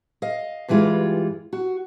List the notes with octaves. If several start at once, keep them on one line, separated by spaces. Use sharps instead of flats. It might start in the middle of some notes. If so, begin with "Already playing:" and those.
D#5 F5
G2 E3 G3 G#3 F4
F#4